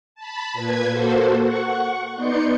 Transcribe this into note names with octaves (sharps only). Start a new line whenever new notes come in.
A5 B5
A#2 B4 G#6
A#3 F#4 A4 C5
F#5 C#6
B3 D#4 D5 C6 G6 C#7